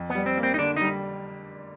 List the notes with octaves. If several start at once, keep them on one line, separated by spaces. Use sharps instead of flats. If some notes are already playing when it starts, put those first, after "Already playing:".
Already playing: F2
B3
G3
C4
A#3
C4
D#4
D3 D4
G3 D#4